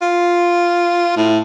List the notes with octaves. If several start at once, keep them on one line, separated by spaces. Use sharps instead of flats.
F4
A2